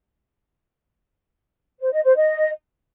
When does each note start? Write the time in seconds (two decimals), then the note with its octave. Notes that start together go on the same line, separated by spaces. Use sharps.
1.80 C5
1.92 D#5
2.04 C5
2.16 D#5